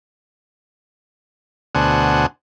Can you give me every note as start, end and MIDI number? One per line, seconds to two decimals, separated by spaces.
1.75 2.26 38
1.75 2.26 47
1.75 2.26 62
1.75 2.26 72
1.75 2.26 78
1.75 2.26 80